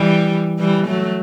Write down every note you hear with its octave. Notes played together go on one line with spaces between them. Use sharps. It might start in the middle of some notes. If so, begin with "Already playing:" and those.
Already playing: E3 G3
E3 G3
F#3 A3